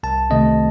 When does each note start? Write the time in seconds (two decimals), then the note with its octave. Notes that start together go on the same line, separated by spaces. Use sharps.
0.03 C2 A5
0.30 C3 D#3 A3 C4 D#5